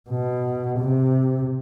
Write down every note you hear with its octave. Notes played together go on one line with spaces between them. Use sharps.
B2
C3